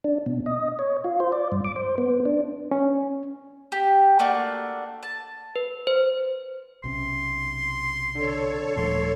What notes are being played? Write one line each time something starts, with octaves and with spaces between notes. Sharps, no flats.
D4
B2
D#5
C#5
F4
C5
D5
G2
D6
C5
B3
D4
C#4
G4
A3 A#3 D4 F#4
A5
B4
C5
B1 C3 C#4 C6
D3 A4 C#5
D#1 A#2 F3 A3 C6